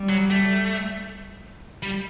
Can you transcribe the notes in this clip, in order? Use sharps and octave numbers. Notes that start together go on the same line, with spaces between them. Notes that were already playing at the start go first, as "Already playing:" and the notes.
Already playing: G3
F#3
A3
G3